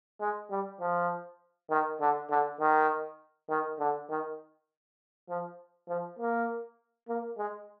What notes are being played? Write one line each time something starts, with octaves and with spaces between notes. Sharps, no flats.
G#3
G3
F3
D#3
D3
D3
D#3
D#3
D3
D#3
F3
F3
A#3
A#3
G#3